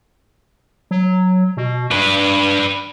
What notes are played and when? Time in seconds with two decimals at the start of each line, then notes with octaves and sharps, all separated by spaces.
0.91 F#3
1.57 B2
1.91 G2 D4 B4